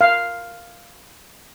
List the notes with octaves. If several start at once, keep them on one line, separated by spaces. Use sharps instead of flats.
F5